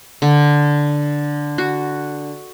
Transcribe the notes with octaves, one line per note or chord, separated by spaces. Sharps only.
D3
F#4